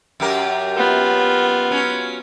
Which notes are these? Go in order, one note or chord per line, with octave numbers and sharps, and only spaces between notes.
F#2 G4 A#4
B3 F4
F#3 C#4